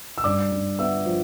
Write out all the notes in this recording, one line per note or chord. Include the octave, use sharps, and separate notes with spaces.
E6
G2 D5 D6
G2
B3 E5 E6
F3